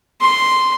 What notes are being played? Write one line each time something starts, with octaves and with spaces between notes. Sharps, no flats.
C6